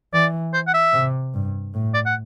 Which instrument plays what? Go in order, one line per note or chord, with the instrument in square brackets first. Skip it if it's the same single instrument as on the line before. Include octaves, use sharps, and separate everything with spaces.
[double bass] E3 [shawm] D5
[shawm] C5
F#5
E5
[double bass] C3
G2
A2
[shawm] D5
F#5